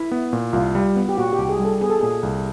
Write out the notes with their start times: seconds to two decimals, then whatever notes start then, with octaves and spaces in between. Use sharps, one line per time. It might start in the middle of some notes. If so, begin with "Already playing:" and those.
Already playing: E4
0.11 B3
0.33 A#2
0.53 C2 F4
0.75 G3
0.96 B3
1.09 G4
1.17 A#2 F#4
1.33 G4
1.38 C2
1.49 G#4
1.59 G3
1.65 A4
1.81 B3 G#4
1.90 A4
2.00 A#2 G#4
2.23 C2